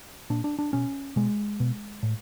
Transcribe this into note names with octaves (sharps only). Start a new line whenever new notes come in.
A#2 D4
D4
D4
B2 C#4
B2 G#3
B2
A2